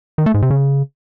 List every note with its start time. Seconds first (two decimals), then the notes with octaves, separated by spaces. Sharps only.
0.18 D#3
0.26 A3
0.34 G#2
0.42 C3
0.50 C#3